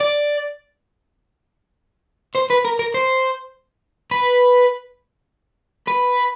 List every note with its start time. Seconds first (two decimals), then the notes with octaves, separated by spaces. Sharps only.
0.01 D5
2.35 C5
2.50 B4
2.65 A#4
2.79 A#4
2.94 C5
4.11 B4
5.88 B4